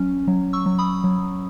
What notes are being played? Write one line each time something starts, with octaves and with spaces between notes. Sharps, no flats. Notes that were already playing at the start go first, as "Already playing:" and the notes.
Already playing: F#3 C#4
F#3
C#6 E6
F#3
B5 D#6
F#3